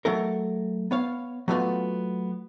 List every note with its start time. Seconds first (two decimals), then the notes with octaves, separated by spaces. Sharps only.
0.05 F#3 A3 A4 A#4
0.91 B3 C#5 F5
1.48 F#3 A3 B3 C#4 F4 F#4